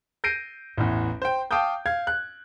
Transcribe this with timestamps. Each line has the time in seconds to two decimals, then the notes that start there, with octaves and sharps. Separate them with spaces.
0.24 G6 A#6 C7 D7 D#7
0.77 A1 E2
1.22 C5 G5
1.51 F5 G5 A5 D6 D#6 G6
1.86 F5 G#6
2.07 F#6